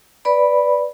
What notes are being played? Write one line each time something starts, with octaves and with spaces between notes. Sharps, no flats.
B4 D5 B5